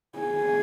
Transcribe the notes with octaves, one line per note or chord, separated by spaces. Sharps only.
G#4